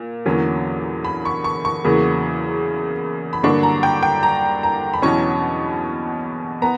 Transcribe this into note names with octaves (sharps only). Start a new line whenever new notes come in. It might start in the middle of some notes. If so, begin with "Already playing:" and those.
Already playing: A#2
E2 D3 F#3 A#3 C#4
B5
C#6
C#6
C#6
E2 C#3 F#3 A#3
B5
G2 D3 F#3 A#3 D4 C#6
A#5
G5
G5
A#5
A#5
B5
E2 B2 F#3 C#4 C#6
B3 A#5